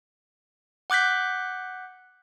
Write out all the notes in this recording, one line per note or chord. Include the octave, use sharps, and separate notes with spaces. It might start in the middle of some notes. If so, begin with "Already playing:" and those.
F#5 D6 F#6 G6 B6